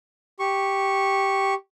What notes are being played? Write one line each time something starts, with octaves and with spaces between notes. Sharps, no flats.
G4 C#6